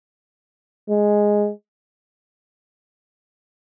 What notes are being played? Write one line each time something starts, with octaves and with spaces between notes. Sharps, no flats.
G#3